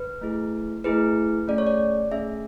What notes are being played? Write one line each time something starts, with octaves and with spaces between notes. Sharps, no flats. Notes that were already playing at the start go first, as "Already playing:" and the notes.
Already playing: B4
A3 E4 G#4
A3 E4 G#4 B4
A3 C#4 G#4 D5
C#5
D5
A3 C#4 G#4 E5